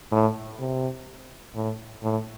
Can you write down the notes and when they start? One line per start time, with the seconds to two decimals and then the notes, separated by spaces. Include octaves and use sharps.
0.12 A2
0.59 C3
1.55 A2
2.02 A2